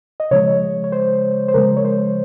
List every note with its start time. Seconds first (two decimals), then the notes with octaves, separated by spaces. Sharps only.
0.20 D#5
0.31 C#3 F3 G#3 C#5
0.84 C#5
0.92 C5
1.48 C5
1.54 C#3 F3 G#3 A#4
1.77 C#5
1.85 C5